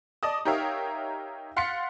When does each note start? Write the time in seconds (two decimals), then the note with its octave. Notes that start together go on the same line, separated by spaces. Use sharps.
0.23 D5 D#5 A5 D#6
0.45 D#4 G4 A#4 C#5 E5 F5
1.57 F5 F#5 C6 A6 B6 C#7